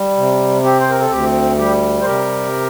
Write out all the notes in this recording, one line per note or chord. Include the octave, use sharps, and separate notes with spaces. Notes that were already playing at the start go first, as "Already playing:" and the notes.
Already playing: G3
C3
C4 G4
C5
A#4
A4
D2 G4
G3 G4
C5
C3 G4 A#4